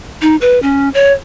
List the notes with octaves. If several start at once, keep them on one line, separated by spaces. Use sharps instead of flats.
D#4
B4
C#4
C#5